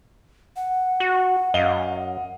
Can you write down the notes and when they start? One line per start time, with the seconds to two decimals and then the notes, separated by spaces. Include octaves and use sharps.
0.56 F#5
1.00 F#4
1.54 F#2 D#5 F5 G7